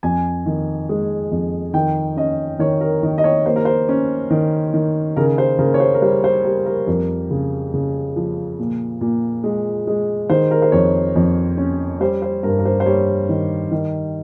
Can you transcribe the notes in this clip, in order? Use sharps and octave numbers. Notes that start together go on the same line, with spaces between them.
F2 G#5
D#3
G#3
F2
D#3 G5
C#4 D#5
D#3 C#5
A#4
D#3
D#5
C#5
A#3 C5
A#4
C5
C#4
D#3
D#3
C#3 A#4
C5
C#3 A#4
C#5
C5
A#4
G3 C5
C5
G3 A#4
A#4
F2 A#4
C#3
C#3
F3
A#2
A#2
G#3
G#3
D#3 C5
A#4
C5
F2 C#5
F2
C#4
G3 C5
C5
G2 A#4
A#4
C5
C5
G3 C#5
D#3
D#3